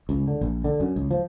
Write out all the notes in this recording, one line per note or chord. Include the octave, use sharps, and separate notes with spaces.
C#2
D3
A#1
D3
F#2
C#2
F3